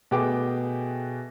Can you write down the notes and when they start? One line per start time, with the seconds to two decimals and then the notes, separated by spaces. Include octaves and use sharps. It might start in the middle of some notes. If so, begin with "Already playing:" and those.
0.11 B2 A3 G#4 B4 G5 D6